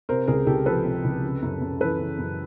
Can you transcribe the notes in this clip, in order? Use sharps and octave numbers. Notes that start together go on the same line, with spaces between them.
C3 A#4 C5
C#2 G#4 A#4
C#2 G4 A4
F3 A4 B4
C3
C#2
C#3
F#2
F#2
E3 A4 B4
C#3
F#2